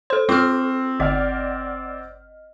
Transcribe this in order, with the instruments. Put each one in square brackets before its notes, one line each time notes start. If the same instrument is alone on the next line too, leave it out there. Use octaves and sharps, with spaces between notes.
[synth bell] A4 C6 [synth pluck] C5
[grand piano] C4 [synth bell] F4 [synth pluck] D6 F6
[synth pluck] G1 [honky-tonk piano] D5 F#5 F6 [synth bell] D#5